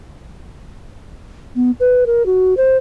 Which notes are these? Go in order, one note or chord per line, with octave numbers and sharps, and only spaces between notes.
B3
B4
A#4
F#4
C5